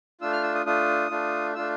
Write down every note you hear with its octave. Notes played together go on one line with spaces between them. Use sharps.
A3 D4 F4 E6
F6
E6
D#6
A3 D4 F4 D#6
A3 D4 F4
A3 D4 F4 E6